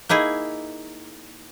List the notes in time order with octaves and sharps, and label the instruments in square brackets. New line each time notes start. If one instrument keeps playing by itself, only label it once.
[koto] A#3 D#4 E4 G#4